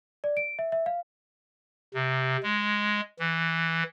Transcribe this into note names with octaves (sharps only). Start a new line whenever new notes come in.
D5
D7
E5
E5
F5
C3
G#3
E3